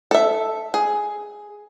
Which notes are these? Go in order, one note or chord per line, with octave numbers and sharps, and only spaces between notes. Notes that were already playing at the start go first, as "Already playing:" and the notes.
A4 E5
G#4